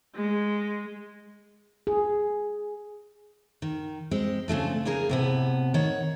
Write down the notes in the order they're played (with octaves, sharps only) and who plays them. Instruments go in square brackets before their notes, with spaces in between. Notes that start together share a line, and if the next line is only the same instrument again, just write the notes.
[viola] G#3
[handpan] G#4
[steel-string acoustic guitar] D#3
G#3 C4
C#3 F3 A3 D4
C#3 A#3 G#4 A#4
A2 C3 B3
D#3 C#5 F#5